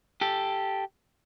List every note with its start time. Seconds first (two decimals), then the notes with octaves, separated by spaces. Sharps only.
0.21 G4 A4